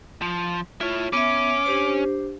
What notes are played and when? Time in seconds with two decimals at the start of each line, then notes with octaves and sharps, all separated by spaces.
0.22 F3
0.81 E4 F4 C#5
1.13 B3 C#4 E5 D6
1.66 D4 G4 C5